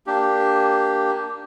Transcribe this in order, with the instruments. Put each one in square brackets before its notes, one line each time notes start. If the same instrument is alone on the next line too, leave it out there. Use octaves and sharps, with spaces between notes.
[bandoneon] A#3 D4 G4